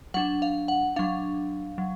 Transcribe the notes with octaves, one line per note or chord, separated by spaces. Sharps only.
F#3 D4 F#5
F5
F#5
F#3 D4 F5
F#3